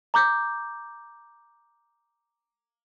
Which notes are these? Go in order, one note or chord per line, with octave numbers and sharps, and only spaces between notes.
A#5 D6 G6